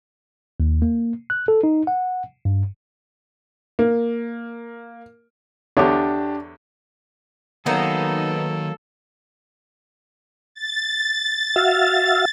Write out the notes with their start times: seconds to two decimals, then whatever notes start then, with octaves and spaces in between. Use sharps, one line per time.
0.60 D#2
0.82 A#3
1.30 F#6
1.48 A4
1.63 D#4
1.87 F#5
2.45 G2
3.79 A#3
5.77 E2 D3 D4 G4 C#5
7.66 D#3 F#3 A#3 B3 D#4 A4
10.55 A6
11.56 F#4 E5 F5